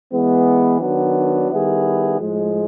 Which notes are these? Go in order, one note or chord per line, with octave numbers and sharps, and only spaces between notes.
E3 G#3 B3
D#3 F#3 B3 D4
D#3 G3 B3 E4 G#4
A2 F3 G#3